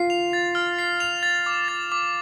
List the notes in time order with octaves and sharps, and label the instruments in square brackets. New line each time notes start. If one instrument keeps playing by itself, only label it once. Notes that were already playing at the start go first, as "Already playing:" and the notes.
Already playing: [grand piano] F4 [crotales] C7
[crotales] F7
A6
F6
C7
F7
A6
D6
A6
D6